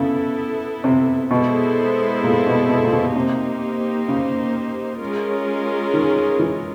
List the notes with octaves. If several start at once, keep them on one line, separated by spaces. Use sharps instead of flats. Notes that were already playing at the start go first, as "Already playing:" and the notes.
Already playing: C#3 B3 E4 A4
C3
B2 G#3 B3 E4 A4 C5
A#2
B2
B2
A#2
B2
C3 A#3 D#4 G4 C5
C#3
G#3 C#4 F4 A#4
D#3
E3